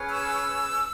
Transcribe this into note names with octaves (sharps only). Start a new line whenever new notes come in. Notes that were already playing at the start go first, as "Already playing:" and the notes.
Already playing: C#4 G#4 B4
E6